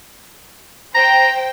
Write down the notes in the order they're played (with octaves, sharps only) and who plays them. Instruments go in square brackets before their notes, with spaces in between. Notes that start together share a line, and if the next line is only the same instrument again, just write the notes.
[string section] C5 G5 [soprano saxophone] A#5